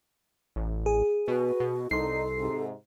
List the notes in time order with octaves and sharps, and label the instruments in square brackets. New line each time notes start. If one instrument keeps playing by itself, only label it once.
[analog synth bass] A1
[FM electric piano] G#4
[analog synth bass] B2 [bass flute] F#4 [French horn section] B4
[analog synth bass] B2
[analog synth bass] C2 [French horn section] D#4 [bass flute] A4 [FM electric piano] C6 C7
[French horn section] G#2 C3